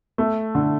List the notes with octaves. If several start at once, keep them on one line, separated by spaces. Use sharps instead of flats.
A3
D3